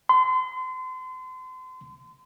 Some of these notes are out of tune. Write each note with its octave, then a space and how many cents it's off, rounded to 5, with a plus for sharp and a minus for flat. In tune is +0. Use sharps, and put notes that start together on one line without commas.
C6 -35